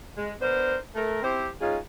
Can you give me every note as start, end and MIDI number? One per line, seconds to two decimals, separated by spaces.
0.17 0.33 56
0.41 0.76 59
0.41 0.76 62
0.41 0.76 70
0.41 0.76 72
0.95 1.21 57
0.95 1.21 70
1.23 1.48 60
1.23 1.48 64
1.23 1.48 67
1.23 1.48 72
1.61 1.77 56
1.61 1.77 61
1.61 1.77 63
1.61 1.77 65
1.61 1.77 68